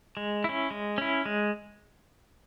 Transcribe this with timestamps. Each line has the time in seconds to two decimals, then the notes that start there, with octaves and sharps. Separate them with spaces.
0.17 G#3
0.44 C#4 E4
0.71 G#3
0.98 C#4 E4
1.26 G#3